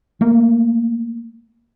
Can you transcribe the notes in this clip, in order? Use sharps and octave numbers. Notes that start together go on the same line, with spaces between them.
A3 A#3